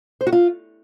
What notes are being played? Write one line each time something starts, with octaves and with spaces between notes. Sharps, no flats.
C5
F#4
F4